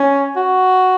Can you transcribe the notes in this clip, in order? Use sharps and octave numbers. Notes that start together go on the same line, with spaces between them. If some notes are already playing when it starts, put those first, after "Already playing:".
Already playing: C#4
F#4